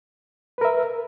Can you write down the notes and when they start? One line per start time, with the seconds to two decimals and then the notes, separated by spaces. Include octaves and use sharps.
0.58 B4
0.61 A#4
0.65 E5